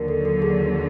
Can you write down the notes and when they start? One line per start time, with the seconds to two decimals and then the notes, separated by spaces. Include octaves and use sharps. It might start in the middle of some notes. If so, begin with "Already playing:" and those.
Already playing: D#2 D3 F#3 A#4
0.08 A4
0.25 A4
0.42 G#4